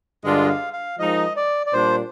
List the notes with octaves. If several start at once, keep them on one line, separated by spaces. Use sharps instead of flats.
G2 D3 G#3 D4 F4 D#5
D#5
F5
F5
F3 G#3 D#4 A#4 D#5
D5
D5
A#2 G3 D4 C5